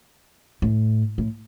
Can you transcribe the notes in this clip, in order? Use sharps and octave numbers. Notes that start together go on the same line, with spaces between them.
A2
A2